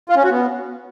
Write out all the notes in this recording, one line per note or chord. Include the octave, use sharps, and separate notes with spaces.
F4
C#4
F#4
B3